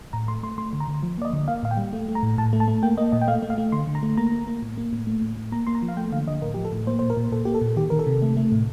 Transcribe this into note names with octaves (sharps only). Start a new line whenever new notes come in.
A2 A#5
A3 C6
A3 C6
A3 C6
D3
A#5
D3
F3
A#3 D5
D#5
D3
A#3 F5
A2 F5
G5
G3
A3
A3
A#5
A2
A2 A5
A3
A5
A3
A#3 G5
A#3 D#5
A#2 D#5
G5
A3 F5
A3
F5
A3
D3 C6
D3
A#5
A3
A#3 A#5
A#3
A#3
A2
A#3
A2
A3
A2
A2
A#3 A#5
A#3 C6
A#5
F3
F5
A3 G5
D3 F5
D3 D#5
A2 A#4
F3 G4
A4
A2
A#3 C5
A#2 C5
A#4
A#2
A#2 A4
A#3 G4
A4
A#2
D#3 G4
D#3 A#4
A4
C3
A3
A3
A2